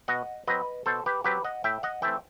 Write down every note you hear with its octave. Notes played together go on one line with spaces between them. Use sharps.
B2 D#5 F#5
F#3 C4 B4 D#5
B2 A4 C5
G4 B4
F#3 C4 G4 B4
D#5 F#5
A2 E5 G5
D#5 F#5
E3 A3 C4 E5 G5